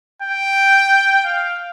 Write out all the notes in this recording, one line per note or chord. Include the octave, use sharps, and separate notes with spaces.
G5
F5